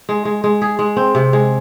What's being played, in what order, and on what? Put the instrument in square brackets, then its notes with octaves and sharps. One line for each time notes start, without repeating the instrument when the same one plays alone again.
[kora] G#3
G#3
G#3
G#4
G#3
C4
C3
G#3